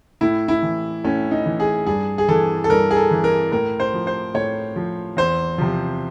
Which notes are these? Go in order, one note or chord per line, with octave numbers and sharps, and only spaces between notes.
A2 E4
E4
E3
A2 C#4
D#4
E3
G#4
G2 G#4
G#4
E3 A4
A4
G2 A#4
G#4
A4
E3
A#4
A2 A#4
C5
F3
C5
A2 C#5
F3
E2 C5
C3 F3